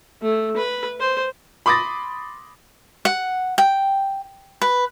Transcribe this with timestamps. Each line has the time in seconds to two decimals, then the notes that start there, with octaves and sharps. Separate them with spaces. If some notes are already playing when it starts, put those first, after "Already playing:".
0.22 A3
0.56 B4
1.00 C5
1.66 B5 C6 D6 D#6 A6 A#6
3.05 F#5
3.58 G5
4.62 B4